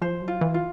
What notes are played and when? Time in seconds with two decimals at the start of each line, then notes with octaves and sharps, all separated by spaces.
0.02 F3 C5
0.22 F#3
0.28 F4
0.41 E3
0.54 F4